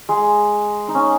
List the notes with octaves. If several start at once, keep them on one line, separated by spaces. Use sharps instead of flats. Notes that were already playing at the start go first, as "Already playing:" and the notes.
G#3
D#4
C#4